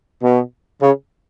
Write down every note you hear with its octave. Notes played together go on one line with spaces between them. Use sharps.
B2
C#3